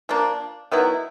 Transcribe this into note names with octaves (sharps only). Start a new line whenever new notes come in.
F3 A#3 D4
D#3 F#3 B3 E4